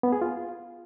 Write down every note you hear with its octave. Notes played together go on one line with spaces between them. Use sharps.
B3
G#4
F4